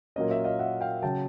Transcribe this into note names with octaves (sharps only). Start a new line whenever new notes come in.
A#2 F#3 A#3 C#4 D#5
E5
D#5 F5
E5 F#5
F5 G5
C#3 F#3 G5 A5